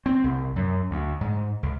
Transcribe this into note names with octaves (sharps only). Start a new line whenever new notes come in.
C4
C2
F#2
D2
G#2
C#2